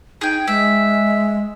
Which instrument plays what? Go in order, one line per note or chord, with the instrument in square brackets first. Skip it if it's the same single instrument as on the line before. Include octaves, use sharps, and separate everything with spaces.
[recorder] D#4 [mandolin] G#4 G5
[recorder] G#3 [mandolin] E5